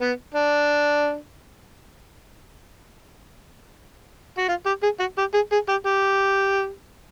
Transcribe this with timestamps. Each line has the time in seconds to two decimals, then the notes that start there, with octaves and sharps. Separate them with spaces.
0.01 B3
0.34 D4
4.38 F#4
4.48 F4
4.66 G4
4.83 G#4
5.00 F#4
5.18 G4
5.34 G#4
5.52 G#4
5.69 G4
5.86 G4